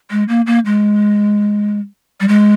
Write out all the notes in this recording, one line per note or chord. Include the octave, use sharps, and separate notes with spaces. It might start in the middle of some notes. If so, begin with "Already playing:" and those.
G#3
A#3
A#3
G#3
G3
G#3